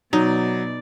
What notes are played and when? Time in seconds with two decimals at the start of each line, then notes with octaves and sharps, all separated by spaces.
0.13 B2 F#3 D#4 D5